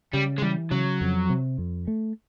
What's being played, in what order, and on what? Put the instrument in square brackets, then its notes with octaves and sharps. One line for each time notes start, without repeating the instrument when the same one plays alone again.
[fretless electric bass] C#3 [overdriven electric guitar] G3
[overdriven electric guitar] G#3
[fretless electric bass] E3 [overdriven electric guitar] G3
[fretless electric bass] C#3 [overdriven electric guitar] F#3
[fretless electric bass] F2
C3
F2
A3